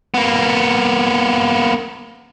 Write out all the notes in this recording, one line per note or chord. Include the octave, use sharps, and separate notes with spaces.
A#3 B3